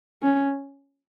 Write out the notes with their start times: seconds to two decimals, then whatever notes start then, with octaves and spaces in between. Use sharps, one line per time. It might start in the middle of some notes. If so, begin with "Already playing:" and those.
0.22 C#4